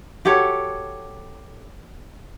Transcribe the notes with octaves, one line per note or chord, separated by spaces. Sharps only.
F#4 G4 A4 C#5